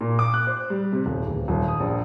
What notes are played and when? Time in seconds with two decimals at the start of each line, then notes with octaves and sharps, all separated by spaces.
0.01 A#2
0.19 D6
0.34 F#6
0.47 C5
0.70 G3
0.93 C3
1.06 D#1
1.27 D1
1.48 D#1
1.68 D#6
1.80 A#1